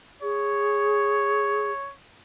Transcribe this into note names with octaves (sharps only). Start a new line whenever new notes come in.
G#4 C#5